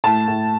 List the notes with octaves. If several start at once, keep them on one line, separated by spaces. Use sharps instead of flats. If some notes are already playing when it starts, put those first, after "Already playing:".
A2 A5
A2